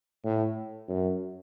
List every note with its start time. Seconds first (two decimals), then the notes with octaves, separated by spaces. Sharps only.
0.24 A2
0.88 F#2